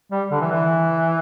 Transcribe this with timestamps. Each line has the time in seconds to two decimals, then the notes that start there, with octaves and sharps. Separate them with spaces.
0.12 G3
0.31 D3
0.41 E3
0.51 E3